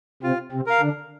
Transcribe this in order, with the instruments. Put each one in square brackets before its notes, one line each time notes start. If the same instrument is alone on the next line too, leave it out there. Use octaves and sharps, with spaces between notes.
[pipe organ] C3 C4 [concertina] F4
[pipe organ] C3 C4
[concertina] A#4 F5
[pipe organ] D3 D4